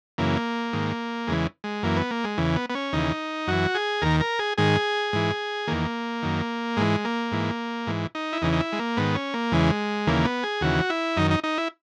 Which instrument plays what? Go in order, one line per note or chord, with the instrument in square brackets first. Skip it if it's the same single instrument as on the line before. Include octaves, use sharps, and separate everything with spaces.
[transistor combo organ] F#2 C#3 E3 A#3
G#2 D#3
E2 C#3 E3 G#3
G#3
F#2 E3 A#3
B3
A#3
G#3
E2 C#3 E3
B3
B3
C#4
D#2 C#3 E3 D#4
F#2 E3 F#4
G#4
D#2 D#3 A#4
A#4
G#4
G#2 D#3 G#4
G#2 E3
E2 D#3 A#3
F#2 D#3
G#2 E3 G#3
A#3
G#2 E3
G#2 E3
D#4
E4
E2 C#3 E3 D#4
D#4
E4
G#3
A#3
G#2 D#3 B3
C#4
A#3
E2 C#3 E3 G#3
D#2 C#3 E3 A#3
B3
G#4
D#2 C#3 E3 F#4
E4
F#2 D#3 D#4
D#4
D#4
E4